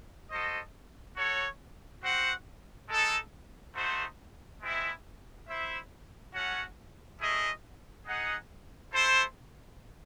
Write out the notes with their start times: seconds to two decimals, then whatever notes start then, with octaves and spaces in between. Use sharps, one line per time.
0.30 F#4 A4 C5 D#5
1.15 F#4 A4 C#5
2.02 C4 F#4 C5 F#5
2.89 G#3 D#4 A4
3.74 A3 D#4 F#4 C5
4.61 G#3 C4 E4
5.47 E4 C5 E5
6.33 A3 C#4 F#4 C#5 F#5
7.20 A3 C#4 E4 G#4 D#5
8.06 D#4 G#4 D#5 F#5
8.93 E4 A4 C5